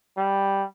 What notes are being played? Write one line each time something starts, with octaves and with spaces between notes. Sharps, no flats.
G3